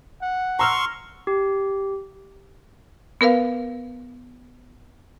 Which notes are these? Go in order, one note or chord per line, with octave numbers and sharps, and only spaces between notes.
F#5
A#5 C6 C#6 E6 F6
G4
B3 A#4 B4 F5